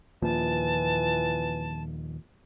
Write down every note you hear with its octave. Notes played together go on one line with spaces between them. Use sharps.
D#2 A#2 E3 F3 A5